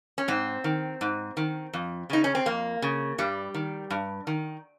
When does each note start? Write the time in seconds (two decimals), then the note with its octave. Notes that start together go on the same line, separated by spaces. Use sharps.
0.18 C#4
0.28 G#2 C4
0.64 D#3
1.01 G#2
1.37 D#3
1.73 F2
2.10 C#3 D#4
2.24 C#4
2.35 C4
2.46 F2 A#3
2.82 C#3
3.18 G2 G3
3.54 D#3
3.90 G2
4.27 D#3